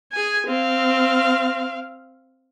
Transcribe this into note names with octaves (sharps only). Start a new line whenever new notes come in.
G#4 G#5
C4 F5